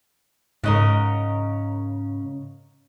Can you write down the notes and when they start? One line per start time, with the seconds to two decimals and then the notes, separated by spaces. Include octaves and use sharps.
0.64 G#2 C#3 A#4 D#5 F#5